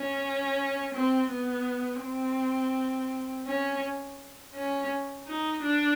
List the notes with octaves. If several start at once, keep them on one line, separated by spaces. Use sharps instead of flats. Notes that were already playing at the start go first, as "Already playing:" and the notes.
Already playing: C#4
C4
B3
C4
C#4
C#4
D#4
D4